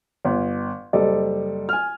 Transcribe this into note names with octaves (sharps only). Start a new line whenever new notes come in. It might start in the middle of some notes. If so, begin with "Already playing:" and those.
G1
F#1 G3 A4 D5 D#5
G#5 F6